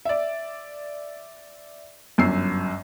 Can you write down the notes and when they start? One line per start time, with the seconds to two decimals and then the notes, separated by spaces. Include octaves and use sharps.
0.05 D5 E5
2.18 G1 F#2 E6 C7